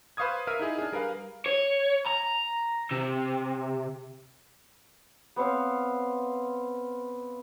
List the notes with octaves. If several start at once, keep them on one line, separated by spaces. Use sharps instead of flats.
B4 C5 F5 C#6 D#6 G#6
A#4 E5 F5 F6 D#7
D#4 E4 G#4
D4 G#4
G3 A#4 B4 F5
C#5
A#5
C3
B3 C4 C#5 F5